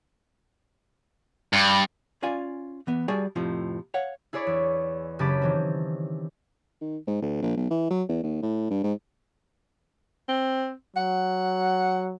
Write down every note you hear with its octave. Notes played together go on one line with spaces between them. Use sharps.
G2
C#4 F4 D5 F5 G#5
E3 B3
G3 F#4 G#4 D5 G#5 A5
F2 A2 C3 F3
C#5 F5 F#5
E4 G#4 C#5 D5 B5 C#6
E2
F#2 C#3 G4 A5 B5 D6
D#3 E3 C4
D#3
G#2
D2
A#1
B1
E3
F#3
E2
D#2
A2
G2
G#2
C4
F#3 F#5